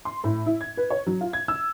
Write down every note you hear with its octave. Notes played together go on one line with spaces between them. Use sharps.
C6
A2
E4
G#6
B4
C#5
F#3
F4
G#6
E6